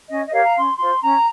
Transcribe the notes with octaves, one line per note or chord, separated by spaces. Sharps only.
C#4 D#5
D#5
G4 A#4 C#5 F5
A#5
C#4 C6
F4 C5 C6
C#4 A#5